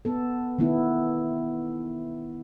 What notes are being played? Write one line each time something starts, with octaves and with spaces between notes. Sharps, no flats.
B3 A4
D#3 A3 B3 E4